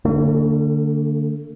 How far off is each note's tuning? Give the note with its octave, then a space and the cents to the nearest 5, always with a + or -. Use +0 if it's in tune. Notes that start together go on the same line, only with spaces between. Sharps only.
D3 +0 A3 +45